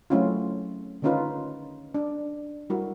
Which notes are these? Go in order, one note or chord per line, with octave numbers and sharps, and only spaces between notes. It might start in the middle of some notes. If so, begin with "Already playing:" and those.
F#3 A3 C4 C#4 E4 F4
D3 D#3 C#4 D#4 F4 B4
D4
G3 E4 F#4 A#4